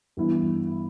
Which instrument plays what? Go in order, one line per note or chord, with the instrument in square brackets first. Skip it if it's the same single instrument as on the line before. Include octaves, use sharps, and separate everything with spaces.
[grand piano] G2 E3 B3 E4